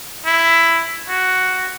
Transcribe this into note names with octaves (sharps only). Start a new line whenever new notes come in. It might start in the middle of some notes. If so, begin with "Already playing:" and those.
E4
F#4